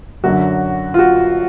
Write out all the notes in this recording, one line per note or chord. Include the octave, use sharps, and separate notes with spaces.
F#2 D3 F#3 F#4
F4
F#4